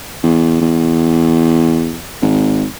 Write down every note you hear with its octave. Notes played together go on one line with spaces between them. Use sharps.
E2
E2
G#1